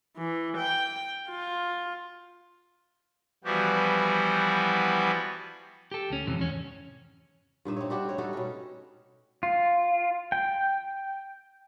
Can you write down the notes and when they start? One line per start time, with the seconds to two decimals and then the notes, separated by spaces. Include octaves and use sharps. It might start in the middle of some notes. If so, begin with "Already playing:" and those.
0.17 E3
0.57 G5
1.29 F4
3.44 E3 F3 G3 B3 F#4 G4
5.92 G4 A4
6.10 D2 C#4
6.27 F2 G#2 C3 E3
6.39 E2 C#4
7.65 G2 A#2 D#4 E5
7.77 C4 C#5
7.90 G3 D4 F#4 G4
8.05 A3 C#5
8.18 G3 D#4 F#4 A4
8.33 B2 C#4
9.43 F4
10.32 G5